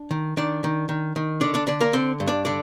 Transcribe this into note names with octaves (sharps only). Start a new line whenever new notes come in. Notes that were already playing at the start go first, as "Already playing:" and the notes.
Already playing: D4
D#3
D#3 D4 D5
D#3
D#3
D#3
D3 D4 D5
D4 D5
D3 D4 D5
A#3 A#4
D3 C4 C5
G2
D4 D5
D3 D4 D5